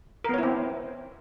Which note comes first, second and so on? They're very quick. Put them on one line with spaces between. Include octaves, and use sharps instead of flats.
A#4 B3 C#5 E4 C4